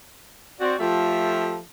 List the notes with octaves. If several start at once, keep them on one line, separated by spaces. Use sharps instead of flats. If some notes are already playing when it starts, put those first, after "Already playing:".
C4 F#4 D5
F3 A3 F4 G4 A4 E5